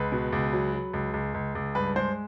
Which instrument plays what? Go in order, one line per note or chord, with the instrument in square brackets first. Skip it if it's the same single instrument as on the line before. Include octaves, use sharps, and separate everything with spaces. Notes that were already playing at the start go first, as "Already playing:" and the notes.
Already playing: [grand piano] C#2 B4
B2
C#2
F#3
F#3
C#2
C#2
C#2
C#2
G2 B4
G#3 C5